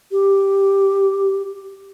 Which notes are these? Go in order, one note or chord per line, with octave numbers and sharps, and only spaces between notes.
G4